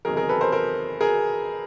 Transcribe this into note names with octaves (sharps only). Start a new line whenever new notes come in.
F#1 E2 C3 D#3 F#3 G#4 A#4
G#4 A#4
A4 B4
A#4 C5
A#4 C5
G#4 A#4